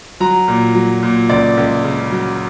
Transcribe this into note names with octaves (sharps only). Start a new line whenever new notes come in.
F#3 A#5
A#2
F#3
A#2
C#2 D5
C#2
C#3
F#3